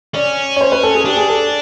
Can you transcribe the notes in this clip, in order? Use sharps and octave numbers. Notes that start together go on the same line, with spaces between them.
C#4 D5
C#5
C5
B4
A4
G#4
D4 G4
G#4
A4